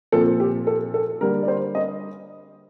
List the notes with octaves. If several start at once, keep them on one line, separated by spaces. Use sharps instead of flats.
A#2 F3 C4 A4
G4
A4
A4
D3 G3 A#3 A#4
D5
C5
D#5